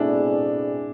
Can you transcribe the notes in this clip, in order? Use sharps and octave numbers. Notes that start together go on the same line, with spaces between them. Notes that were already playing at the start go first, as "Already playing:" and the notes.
Already playing: B2 A3 C4 D4 E4 G#4 D5